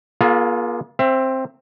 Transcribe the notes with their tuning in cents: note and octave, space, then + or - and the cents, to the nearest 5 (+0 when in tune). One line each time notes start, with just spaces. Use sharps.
A#3 +45 F4 +0 G#4 +40
C4 +10 E5 +25